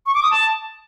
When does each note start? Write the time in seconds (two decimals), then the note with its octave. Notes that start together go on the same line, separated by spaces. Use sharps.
0.06 C#6
0.15 D6
0.23 D#6
0.31 A5